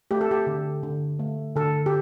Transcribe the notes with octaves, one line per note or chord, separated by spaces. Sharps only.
A3 G4
A4
G4
D3
D3
A3
D3 A4
G4